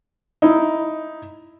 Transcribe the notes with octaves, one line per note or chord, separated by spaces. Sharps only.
D#4 E4